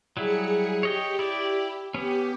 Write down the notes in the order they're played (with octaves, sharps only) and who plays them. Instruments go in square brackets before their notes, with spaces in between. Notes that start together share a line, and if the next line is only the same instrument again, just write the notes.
[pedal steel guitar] F#3 G3 E4 [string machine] G#4 C#7
[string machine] G4 [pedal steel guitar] C#5 D#5 G5
[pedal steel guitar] E4 D5
[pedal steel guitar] B3 C#4 [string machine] G4